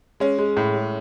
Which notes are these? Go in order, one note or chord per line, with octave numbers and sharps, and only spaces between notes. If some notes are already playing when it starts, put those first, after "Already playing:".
G#3 C#4
G#3
A2
G#3